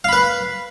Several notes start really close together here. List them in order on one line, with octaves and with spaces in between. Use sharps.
F5 B5 B4